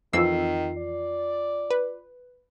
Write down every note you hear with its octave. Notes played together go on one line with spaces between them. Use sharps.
F2 D#3 E3 F4 E6 C7
D5
B4